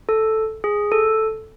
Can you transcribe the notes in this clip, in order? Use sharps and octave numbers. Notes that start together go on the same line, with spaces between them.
A4
G#4
A4